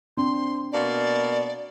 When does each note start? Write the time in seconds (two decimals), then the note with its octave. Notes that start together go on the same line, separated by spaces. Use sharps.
0.17 C4 D4 C6
0.72 B2 A#3 D5